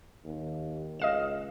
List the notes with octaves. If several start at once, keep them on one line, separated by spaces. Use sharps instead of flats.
D#2
C#2 D#5 F5 E7